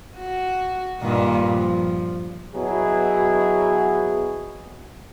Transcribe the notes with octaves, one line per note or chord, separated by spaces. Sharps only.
F#4
G2 A#2 D#3
F3
B2 F#3 E4 G#4